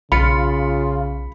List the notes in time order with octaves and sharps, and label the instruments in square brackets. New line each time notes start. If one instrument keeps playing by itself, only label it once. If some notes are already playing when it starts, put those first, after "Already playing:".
[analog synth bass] B1 [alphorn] C#3 [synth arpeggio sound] F4 [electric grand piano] B5 C#7